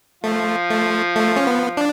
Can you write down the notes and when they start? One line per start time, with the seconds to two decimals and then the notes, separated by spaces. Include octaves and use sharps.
0.24 F3 A3 F4
0.70 A3
1.16 A3
1.36 C#4
1.47 B3
1.77 D4